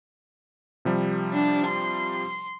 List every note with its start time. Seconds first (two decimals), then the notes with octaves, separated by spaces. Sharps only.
0.85 C3 F3 G3
1.33 D4
1.67 C6